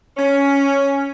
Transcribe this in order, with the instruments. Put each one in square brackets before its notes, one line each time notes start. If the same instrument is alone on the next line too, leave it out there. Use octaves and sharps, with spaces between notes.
[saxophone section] C#4